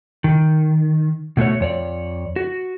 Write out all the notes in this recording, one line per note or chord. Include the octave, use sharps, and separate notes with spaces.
D#3
B2 A3 F#4 C#5
F2 C#5 D5
F#4